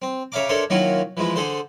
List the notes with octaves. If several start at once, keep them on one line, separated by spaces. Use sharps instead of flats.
C4
C#3 C#5 E5 F5 A#5 D6
D4 A4 A#4 C5 C#5 E5
D#3 F#3 A#3 C#4 E4 F4
E3 F3 G#3 E4
D3 G#4 A4 C5